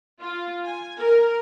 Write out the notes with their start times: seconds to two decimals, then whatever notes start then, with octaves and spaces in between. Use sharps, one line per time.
0.21 F4
0.64 G#5
0.98 A#4